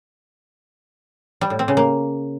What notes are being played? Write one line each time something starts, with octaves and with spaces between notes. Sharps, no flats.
G3
A2
C4
C#3
A#3